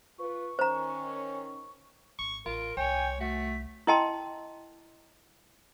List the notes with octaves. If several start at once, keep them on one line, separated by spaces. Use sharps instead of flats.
F4 B4 C#6
D#3 C#4 C5 A#5
G#1 C#6
A1 F4 A#4 D7
C2 C#5 G5 G#5
A3 F#4 B6
E4 A#4 D#5 G5 A5 C6